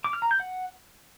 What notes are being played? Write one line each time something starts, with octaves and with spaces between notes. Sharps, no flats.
D6
F6
A#5
G6
F#5